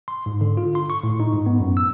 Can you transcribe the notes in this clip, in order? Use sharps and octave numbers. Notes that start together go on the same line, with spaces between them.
C6
G#2
D3
F4
C6
C#6
A2
D#4
G#2
B3
F#2
E6